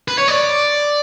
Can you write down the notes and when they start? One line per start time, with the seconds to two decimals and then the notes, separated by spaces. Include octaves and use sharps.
0.08 B4
0.18 C#5
0.28 D5